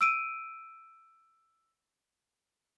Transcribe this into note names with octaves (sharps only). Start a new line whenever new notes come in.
E6 D7 D#7